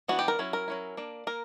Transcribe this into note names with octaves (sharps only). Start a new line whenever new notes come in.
E3 B3 D4 F#4
G4
A#4
F#3 C#4 E4
A#4
F#3 C#4 E4
A#3 D4
A#3 A#4